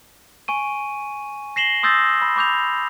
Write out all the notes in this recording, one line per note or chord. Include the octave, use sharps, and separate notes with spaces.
G#5 C#6 D#7
A#6 C7 E7 F#7 G7
C6 D#6 E6 G6 A6 A#6
B5
B5 D6 G6 F7